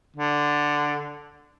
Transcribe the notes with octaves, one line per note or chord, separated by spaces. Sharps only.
D3